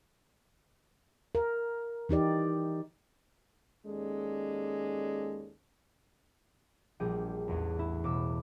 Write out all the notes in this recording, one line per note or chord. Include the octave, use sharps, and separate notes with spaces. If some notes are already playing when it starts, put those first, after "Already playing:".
A#4
E3 D#4 G4 D5
D#2 G#3 C#4 A4 D5
A#1 G3 G#4 G5
A1 E2
E4
E1 D6 E6